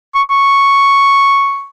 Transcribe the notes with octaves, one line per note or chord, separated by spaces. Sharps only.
C#6
C#6